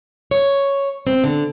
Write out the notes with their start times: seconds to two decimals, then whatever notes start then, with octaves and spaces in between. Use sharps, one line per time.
0.31 C#5
1.07 C4
1.24 D3